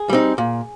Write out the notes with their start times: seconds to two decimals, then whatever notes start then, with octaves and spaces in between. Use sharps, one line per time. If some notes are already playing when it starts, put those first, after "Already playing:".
Already playing: G#4
0.09 G3 C4 D#4
0.38 A#2